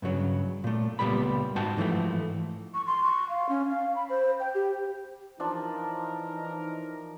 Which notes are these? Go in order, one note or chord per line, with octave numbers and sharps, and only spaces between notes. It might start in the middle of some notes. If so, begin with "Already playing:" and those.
G2 C#3 F#3
A#2 A3
C#2 A#2 G3 B3 B5
G#2 F#4 G5 A5
G#2 E3 F3 A3
C#6
C6
C#6
F5
C#4
F5
B5
C5
G5
G4
E3 F3 D4 D#4 A#4